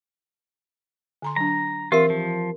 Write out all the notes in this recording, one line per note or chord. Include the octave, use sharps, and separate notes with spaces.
D3 A#5 C6
F#3 D4 A#5
E3 C4 F4 G4 A#4 E5 C6
F3